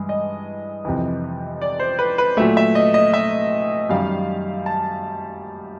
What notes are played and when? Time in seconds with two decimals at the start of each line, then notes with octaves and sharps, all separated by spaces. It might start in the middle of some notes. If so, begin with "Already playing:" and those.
Already playing: G2 E3 G#3
0.09 D#5
0.85 F2 C3 E3
1.62 D5
1.80 C5
1.99 B4
2.18 B4
2.37 A#2 F#3 A3 E5
2.57 E5
2.75 D#5
2.94 D#5
3.14 E5
3.89 F#2 D#3 G3 F5
4.66 A5